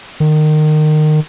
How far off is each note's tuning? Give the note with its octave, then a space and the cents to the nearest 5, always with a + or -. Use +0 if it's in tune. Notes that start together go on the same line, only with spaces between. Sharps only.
D#3 -25